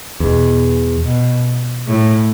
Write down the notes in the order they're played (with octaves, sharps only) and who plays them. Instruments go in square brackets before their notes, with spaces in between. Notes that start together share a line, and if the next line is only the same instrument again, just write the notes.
[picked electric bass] E2 [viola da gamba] B2
[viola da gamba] B2
A2